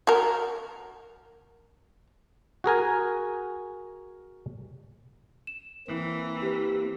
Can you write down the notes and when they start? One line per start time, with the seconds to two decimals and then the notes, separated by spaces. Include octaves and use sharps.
0.07 F#4 A#4
2.64 F#4 G#4 A#4 G#5
5.47 E7
5.87 E3 A#3 C4
6.42 G4 B4